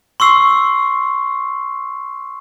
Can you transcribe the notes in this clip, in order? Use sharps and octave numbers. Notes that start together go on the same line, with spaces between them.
C6 C#6 E6 C7